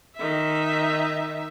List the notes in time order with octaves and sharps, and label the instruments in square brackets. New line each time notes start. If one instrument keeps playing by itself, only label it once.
[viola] D#3 E5